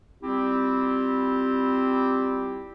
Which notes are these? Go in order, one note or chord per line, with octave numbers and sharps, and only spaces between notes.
G3 C4 E4 F4 G4